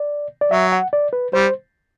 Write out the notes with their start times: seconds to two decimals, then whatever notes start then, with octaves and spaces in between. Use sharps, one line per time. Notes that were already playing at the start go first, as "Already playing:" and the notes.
Already playing: D5
0.41 D5
0.51 F#3 E5
0.72 F#5
0.93 D5
1.13 B4
1.33 G3 C5